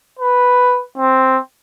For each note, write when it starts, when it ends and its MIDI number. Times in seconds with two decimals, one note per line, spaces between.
0.19 0.82 71
0.97 1.38 60